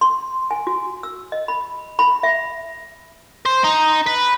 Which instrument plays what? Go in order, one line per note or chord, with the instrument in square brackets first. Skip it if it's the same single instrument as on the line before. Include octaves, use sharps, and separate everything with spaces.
[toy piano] C6
G#5
F#4
E6
D#5
B5
B5
E5
[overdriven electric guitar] C5
D#4
B4